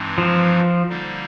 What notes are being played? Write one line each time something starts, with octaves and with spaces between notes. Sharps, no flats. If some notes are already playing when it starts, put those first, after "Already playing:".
Already playing: G2 E3 G#3 C4 D#4
F3
D3 G3 A#3 D#4